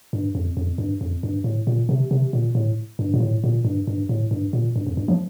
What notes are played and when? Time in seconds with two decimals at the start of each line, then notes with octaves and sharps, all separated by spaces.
0.13 G2
0.35 F2
0.57 F2
0.78 G2
1.01 F2
1.23 G2
1.44 A2
1.67 A#2
1.89 C3
2.11 C3
2.33 A#2
2.55 A2
2.99 G2
3.14 A#2
3.20 A2
3.44 A#2
3.65 G2
3.87 G2
4.09 A2
4.31 G2
4.53 A#2
4.76 G2
4.87 F2
4.97 G2
5.08 F3